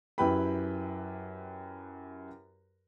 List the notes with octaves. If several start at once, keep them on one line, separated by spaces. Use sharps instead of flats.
F#2 E4 G4 B4 G5 B5